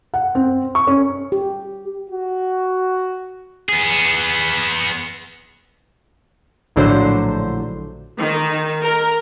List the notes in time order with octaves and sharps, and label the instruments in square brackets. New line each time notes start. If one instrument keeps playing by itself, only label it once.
[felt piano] F#5
C4
C#6
C#4
[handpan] G4
[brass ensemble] F#4
[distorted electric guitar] B3 G#4
[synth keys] A#1 A2 D3 F#3 C5
[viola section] D#3
A#4